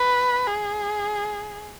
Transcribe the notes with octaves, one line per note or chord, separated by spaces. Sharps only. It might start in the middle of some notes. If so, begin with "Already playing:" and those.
Already playing: B4
G#4